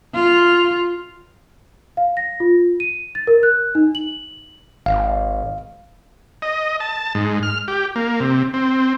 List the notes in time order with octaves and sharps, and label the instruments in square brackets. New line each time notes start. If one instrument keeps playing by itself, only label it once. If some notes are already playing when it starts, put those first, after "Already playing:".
[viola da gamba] F4
[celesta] F5
A#6
F4
D#7
A6
A#4
F#6
D#4
F#7
[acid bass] G#1 [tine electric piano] F5
[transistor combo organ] D#5
A5
G#2
F6
G4
A#3
C3
C4